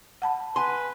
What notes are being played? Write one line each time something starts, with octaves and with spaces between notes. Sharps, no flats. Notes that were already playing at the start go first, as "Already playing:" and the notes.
F#5 A5 B5
B4 G#5 C6